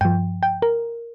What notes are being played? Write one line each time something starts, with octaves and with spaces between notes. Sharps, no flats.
G2 F3 G5
G5
A#4